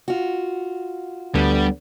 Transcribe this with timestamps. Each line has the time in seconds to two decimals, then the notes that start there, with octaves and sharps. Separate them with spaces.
0.08 F4 F#4
1.34 D2 D3 G3 B3